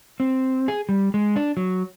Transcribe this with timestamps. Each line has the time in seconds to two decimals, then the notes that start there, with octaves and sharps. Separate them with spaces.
0.20 C4
0.68 G#4
0.89 G3
1.14 G#3
1.36 D4
1.57 F#3